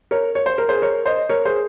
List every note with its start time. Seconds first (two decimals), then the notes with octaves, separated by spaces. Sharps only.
0.11 A#4 C#5
0.35 C#5
0.46 C5
0.58 A#4
0.69 G#4 C5
0.82 A#4 C#5
1.06 C5 D#5
1.29 A#4 C#5
1.45 G#4 C5